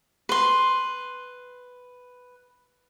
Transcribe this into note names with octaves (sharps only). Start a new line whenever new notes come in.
B4 C6